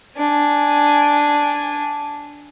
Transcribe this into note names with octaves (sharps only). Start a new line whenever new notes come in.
D4 G#5